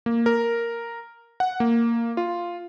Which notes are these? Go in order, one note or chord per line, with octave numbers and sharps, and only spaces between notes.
A#3
A#4
F#5
A#3
F4